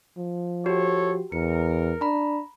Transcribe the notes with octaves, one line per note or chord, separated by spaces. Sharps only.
F3
F#4 G4 A4 C#5
E2 A#4 C#7
D4 A#5 B5